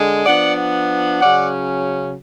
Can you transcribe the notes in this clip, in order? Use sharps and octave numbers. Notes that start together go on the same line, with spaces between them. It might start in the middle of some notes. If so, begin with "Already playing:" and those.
Already playing: D3 G#3
F3 B3 D4 D5 F#5
C#3 F#3 C#4 D5 F#5